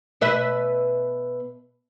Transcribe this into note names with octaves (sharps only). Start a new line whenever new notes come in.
B2 B4 E5